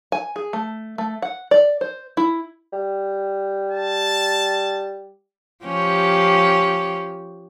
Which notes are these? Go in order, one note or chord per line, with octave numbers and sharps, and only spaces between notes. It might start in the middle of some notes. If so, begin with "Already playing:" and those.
G#5
G#4
A3
A3
F#5
D5
C5
E4
G3
A5
F3 C#4 G4